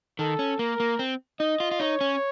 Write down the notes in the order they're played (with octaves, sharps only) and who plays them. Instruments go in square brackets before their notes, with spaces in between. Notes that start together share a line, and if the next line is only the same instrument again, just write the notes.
[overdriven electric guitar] D#3 [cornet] A4
[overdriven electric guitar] C#4
[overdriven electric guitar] A#3 [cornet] A#4
[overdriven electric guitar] A#3
C4
[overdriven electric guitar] D#4 [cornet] D#5
[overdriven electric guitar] F4
F4
[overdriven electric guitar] D#4 [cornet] C#5
[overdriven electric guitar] C#4